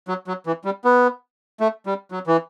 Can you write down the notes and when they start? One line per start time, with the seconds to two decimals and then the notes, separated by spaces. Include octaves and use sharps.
0.08 F#3
0.27 F#3
0.46 E3
0.65 G3
0.85 B3
1.60 A3
1.86 G3
2.11 F#3
2.27 E3